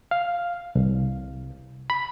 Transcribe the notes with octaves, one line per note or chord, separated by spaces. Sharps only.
F5
C2
B5